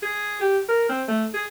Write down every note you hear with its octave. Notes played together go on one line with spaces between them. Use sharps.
G#4
G4
A#4
C4
A3
G#4